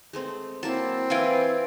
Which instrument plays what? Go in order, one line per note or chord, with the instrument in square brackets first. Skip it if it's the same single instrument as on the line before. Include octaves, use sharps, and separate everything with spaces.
[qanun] G#3 A3 C4
[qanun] F#3 A#3 E4 [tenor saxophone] C4 [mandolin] A5
[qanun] E3 B4 [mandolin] E4 F4 G#5